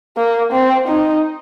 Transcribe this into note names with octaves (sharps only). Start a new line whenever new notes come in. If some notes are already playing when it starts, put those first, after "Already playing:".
A#3
C4
D#4